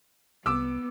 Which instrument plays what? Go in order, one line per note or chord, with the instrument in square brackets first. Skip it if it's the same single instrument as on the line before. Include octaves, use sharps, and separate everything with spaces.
[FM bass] C2 [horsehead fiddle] B3 [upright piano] D6 E6